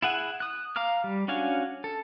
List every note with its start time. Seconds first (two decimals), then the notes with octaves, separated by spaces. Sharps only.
0.02 E4 G#4 F#5 G#5
0.40 D#6 F#6
0.76 F5 A#5 D6 F6
1.04 G3
1.28 C#4 D4 F#4 F5 G#5
1.84 A4